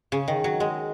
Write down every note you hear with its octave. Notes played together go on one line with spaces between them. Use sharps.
C#3
D#3
F#3
G#3